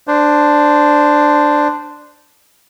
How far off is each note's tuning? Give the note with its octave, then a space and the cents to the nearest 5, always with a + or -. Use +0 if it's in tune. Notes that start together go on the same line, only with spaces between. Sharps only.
D4 +5 C5 -15